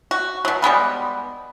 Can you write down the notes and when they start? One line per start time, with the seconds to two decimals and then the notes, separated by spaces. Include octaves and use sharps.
0.11 F#4
0.45 B2 F#3
0.62 G3 G#3 B3 B4